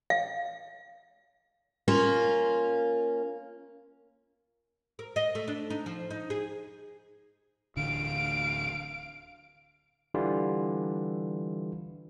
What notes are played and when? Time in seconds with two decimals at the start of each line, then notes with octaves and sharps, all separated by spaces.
0.10 F5
1.88 A#3 C#4 F4
4.99 A#4
5.16 D#5
5.35 A3
5.48 D4
5.70 D#4
5.86 F3
6.11 D#4
6.30 G#4
7.77 D1 D3 E3 F5 D7
10.14 D3 E3 G3 F4